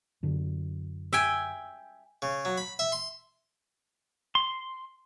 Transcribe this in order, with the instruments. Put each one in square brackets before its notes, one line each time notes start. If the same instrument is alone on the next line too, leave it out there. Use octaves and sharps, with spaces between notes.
[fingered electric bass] F#2 D3
[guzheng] E5 G5 G#5
[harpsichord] C#3
F#3
B5
E5
C6
[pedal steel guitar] C6